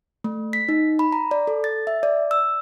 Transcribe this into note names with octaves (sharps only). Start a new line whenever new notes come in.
A3
B6
D#4
B5
A#5
D5
A4
A6
E5
D5
E6